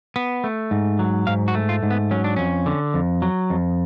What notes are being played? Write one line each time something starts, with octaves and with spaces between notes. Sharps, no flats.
B3
A3
G#2
F#3
G#2 F5
F#4
A3
F4
G#2
B3
F#3 C#4
D4
F2 C#4
D3
F2
F#3
F2